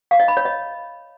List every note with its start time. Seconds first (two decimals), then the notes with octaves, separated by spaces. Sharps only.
0.11 F5
0.20 D#5
0.28 B5
0.37 C#5
0.45 D#5